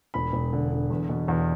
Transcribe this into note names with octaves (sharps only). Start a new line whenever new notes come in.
E1 B5
E1
D3
D3
E2
B2
E2